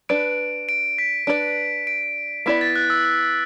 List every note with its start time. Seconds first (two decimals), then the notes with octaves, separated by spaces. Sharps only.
0.09 D4 B4 D5 D7
0.69 D7
0.98 B6
1.27 D4 B4 D5 D7
1.87 D7
2.46 B3 E4 D5 B6
2.61 A6
2.76 F#6
2.90 E6
3.05 E6